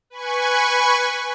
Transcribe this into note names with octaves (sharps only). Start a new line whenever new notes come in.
B4 G#5 C#6